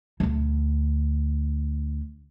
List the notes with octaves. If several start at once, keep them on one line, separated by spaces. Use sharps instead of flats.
D2 D3